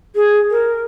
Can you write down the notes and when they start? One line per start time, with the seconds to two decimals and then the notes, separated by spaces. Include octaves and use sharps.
0.16 G#4
0.51 A#4